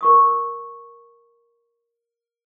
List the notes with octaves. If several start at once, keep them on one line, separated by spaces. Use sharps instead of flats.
A#4 C#6 D#6